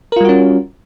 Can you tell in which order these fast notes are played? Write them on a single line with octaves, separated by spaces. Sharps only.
A#4 F4 G3 F#4 C#4